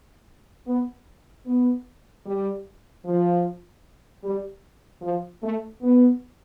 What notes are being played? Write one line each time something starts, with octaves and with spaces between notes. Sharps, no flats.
B3
B3
G3
F3
G3
F3
A3
B3